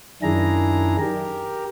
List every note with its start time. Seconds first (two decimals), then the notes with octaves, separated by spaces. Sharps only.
0.22 F#2 D#3 D4 E4 G#4 A#5
0.99 G4 A#4